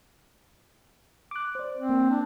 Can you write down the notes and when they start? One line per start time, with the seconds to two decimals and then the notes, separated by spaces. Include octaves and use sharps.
1.31 D6 F#6
1.55 C5 D5
1.76 C4
1.89 A#3
2.10 D4